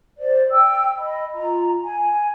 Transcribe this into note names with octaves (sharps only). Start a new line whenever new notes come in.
C5 D5
G5 E6
D#5 B5
F4 A#5
G#5